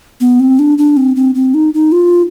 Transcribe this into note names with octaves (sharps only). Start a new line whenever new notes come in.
B3
C4
D4
D4
C4
C4
C4
D#4
D#4
F4